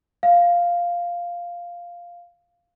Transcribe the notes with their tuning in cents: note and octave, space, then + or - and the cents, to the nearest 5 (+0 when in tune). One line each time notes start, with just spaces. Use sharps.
F5 +0